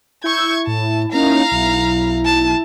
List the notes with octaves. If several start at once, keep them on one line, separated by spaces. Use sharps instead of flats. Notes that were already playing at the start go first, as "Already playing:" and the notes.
E4 C#6 E6 G6 G#6
A2 A5
A#3 C#4 D#4 F5 A#5
B1
A5